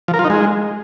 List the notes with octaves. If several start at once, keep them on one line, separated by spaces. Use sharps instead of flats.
F3
A#4
F4
D#4
G#3